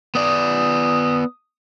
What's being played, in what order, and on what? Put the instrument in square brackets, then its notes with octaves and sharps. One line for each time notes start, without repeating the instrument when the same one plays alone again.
[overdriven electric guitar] B3 D5 [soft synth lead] D#6